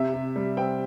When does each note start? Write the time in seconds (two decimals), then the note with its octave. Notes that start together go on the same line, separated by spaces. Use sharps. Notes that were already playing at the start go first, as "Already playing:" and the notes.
Already playing: C3 E5
0.14 C3
0.36 G3
0.57 C4 G5